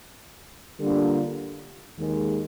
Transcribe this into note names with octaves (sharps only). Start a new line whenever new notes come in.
D3 G3 A#3 D4 F4
D#2 D#3 G#3